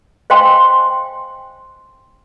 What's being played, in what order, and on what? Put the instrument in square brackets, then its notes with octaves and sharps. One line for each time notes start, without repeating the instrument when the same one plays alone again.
[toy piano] C5 D#5 F5 G5 G#5 C6